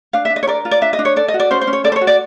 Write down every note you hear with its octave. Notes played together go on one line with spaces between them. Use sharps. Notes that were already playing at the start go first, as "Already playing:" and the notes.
D4 F5
E5
D4
D#5
C#5
A#4 D5
F4
D5
D4 E5
D#5
D4
C#5
A4 D5
D#5
F#4
D5
C#4 C5
C5
C#4
C#5
A4 D5
C5
C#5
F#4
D5